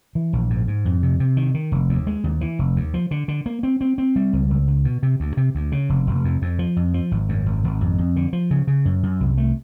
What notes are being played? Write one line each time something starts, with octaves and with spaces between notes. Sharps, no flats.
E3
A#1
G#2
G#2
F2
C3
C3
D#3
D#3
F1
D#2
G#3
D#2
E3
F1
D#2
F3
D3
D3
A#3
C4
C4
C4
G3
C#2
C#2
C#2
B2
C3
D2
C3
D2
C#3
F1
F1
F2
F2
F3
F2
F3
G#1
F#2
G#1
G#1
F2
F2
D3
F3
C#3
C#3
F#2
F#2
C2
A3